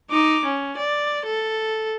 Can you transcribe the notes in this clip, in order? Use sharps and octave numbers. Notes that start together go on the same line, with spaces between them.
D#4 D6
C#4
D5
A4